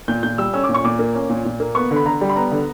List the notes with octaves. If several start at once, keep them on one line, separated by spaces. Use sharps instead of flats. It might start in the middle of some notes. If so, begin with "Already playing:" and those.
A#2 G6
A#2 G6
G3 E6
C#4 E6
A#2 D6
C#6
A#2 D6
A#3
C#4
A#2
A#2
A#3
B3 C#6
D3
B5
D3 A#5
G3
B5
B3 A#5
D3